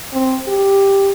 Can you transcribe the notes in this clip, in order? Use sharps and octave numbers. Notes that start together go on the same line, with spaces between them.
C4
G4